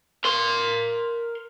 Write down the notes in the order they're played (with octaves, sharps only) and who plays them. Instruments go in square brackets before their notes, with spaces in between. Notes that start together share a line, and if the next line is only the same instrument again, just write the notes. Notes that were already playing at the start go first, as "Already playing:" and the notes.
[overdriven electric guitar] A#4 C6